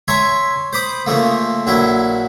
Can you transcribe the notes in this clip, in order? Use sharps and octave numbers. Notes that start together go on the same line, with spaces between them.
C#5 E5 G#5 A#5 C6
C5 B5 D6 D#6
C#3 F3 A3 A#3
A#1 F#3 E4